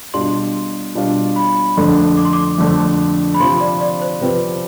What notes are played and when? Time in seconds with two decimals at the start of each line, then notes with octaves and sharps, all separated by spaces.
0.14 B2 G3 D4 F4 C6
0.95 B2 G3 D4 F4
1.36 B5
1.77 F2 D3 A3 D4 C6
2.17 D6
2.25 C6
2.33 D6
2.58 F2 D3 A3 D4
3.34 B5
3.40 C3 F3 C4 G4 C6
3.60 D5
3.81 D5
4.01 C5
4.21 C3 F3 C4 G4 B4